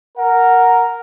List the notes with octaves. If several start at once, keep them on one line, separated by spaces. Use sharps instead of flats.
A#4 F#5